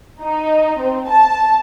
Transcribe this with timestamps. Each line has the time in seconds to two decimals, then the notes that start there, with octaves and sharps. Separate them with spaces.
0.21 D#4
0.79 C4
1.08 A5